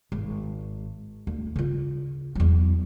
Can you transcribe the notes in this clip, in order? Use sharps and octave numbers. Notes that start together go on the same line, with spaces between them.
G#1
D2
C#3 F4
E2 F#3